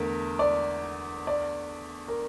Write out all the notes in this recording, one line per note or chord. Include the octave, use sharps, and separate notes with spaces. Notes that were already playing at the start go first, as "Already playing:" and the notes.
Already playing: E2 D3 A3 A#4
D5
D5
A#4